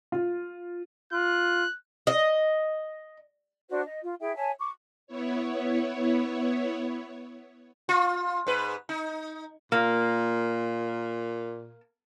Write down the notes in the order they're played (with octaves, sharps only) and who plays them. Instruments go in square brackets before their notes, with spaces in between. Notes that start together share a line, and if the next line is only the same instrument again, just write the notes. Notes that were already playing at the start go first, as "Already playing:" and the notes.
[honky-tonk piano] F4
[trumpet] F4 [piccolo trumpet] F#6
[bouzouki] D#5
[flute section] D4 F#4 C5
D#5
F4
E4 G#4 E5 G5
C#5 E5 G#5 A5
C#6 D6
[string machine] B3 E4 C#5
[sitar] F4
G#2 B4
D#4
[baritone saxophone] A#2 [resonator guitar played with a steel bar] A#3